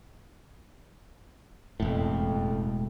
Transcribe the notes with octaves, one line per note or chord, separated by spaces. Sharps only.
E1 F2 A2